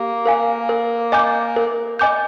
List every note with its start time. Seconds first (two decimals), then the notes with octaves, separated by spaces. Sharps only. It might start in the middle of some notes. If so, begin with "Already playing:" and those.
Already playing: A#3 G4
0.26 A#4 F5 G#5
0.69 A#4
1.12 D#5 G#5 D6 G6
1.56 A#4
1.99 D#5 G#5 D6 G6